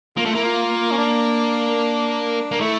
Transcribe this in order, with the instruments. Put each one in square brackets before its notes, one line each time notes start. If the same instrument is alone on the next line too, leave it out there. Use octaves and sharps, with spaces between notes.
[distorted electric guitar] A#3 [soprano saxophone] F4
[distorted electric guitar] A3
[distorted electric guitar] A#3 [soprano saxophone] E4
[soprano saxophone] F4
C#4
D4
[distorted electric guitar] A#3
[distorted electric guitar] A3 [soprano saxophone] E4